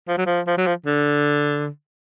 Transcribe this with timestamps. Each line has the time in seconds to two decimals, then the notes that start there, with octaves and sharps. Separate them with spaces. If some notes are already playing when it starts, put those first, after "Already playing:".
0.08 F3
0.17 F#3
0.26 F3
0.47 F3
0.58 F#3
0.67 F3
0.86 D3